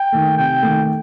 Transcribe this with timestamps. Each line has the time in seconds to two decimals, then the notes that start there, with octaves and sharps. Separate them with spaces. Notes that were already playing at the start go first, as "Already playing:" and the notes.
Already playing: G5
0.12 D#3 A3
0.37 C3 G5
0.62 D#3 A3